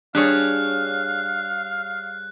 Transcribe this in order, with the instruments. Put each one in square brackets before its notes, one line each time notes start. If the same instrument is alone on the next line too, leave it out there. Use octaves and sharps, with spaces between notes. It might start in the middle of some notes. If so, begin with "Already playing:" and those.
[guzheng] G3 G#4 C#5 [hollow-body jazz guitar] D4 [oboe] F5 [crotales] F#6